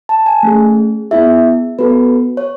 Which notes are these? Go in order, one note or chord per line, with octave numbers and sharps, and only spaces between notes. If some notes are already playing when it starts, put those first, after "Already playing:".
A5
G#5
A3 C#4 G#4
B3 E4 G#4 E5
B3 F#4 A4 B4
C#5